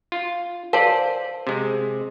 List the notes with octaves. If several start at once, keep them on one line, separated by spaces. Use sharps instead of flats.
F4
A#4 C5 D5 F5 A5
C3 G#3